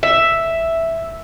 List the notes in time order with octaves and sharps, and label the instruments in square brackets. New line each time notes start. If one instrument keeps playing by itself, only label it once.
[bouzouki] E5